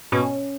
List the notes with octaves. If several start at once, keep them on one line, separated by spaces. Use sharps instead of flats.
B2 C#4